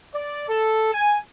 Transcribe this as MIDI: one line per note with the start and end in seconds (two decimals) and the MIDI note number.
0.14 0.48 74
0.49 0.91 69
0.94 1.19 80